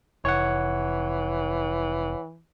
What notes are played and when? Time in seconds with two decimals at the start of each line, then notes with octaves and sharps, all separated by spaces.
0.25 F1 E3 C#5 F#5